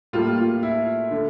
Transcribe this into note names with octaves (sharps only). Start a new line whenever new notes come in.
A2 G3 A#3 F4
F4
E4
D3 A3